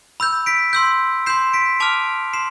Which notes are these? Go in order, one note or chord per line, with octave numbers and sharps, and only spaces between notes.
B5 E6 G6
B6 D7
C6 E6 G6
C6 G6 C7 E7
B6 D7
A5 D6 F6 D7 F7
C6 C7 E7